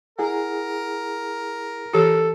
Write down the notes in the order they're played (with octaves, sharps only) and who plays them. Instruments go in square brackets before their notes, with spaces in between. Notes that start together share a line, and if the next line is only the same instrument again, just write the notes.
[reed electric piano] E4 G#4 F#5 [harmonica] A#4
[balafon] E3 G4 [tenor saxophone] A4